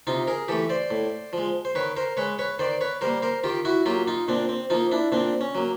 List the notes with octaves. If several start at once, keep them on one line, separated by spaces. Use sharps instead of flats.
C3 D#4 F4
G#4 A#4
E3 A3 G4 A4
C5 D5
A2
F3 G#3
C5
D#3 B4 C#5
A#4 C5
G#3 B4 C#5
B4 C#5
D#3 C5 D5
B4 C#5
G3 A#3 A#4 C5
A#4 C5
D#3 F4 G4
E4 F#4
F#3 A#3 F4 G4
D#4 F4
A#2 C4 D4
C4
F3 A#3 D#4 F4
D4 E4
A#2 C4 D4
C#4
F#3 A#3